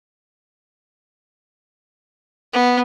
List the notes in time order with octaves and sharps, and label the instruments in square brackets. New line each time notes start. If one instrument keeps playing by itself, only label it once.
[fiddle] B3